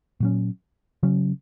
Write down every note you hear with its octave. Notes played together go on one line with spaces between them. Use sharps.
A#2 F#3 C#4
C#3 F#3 C#4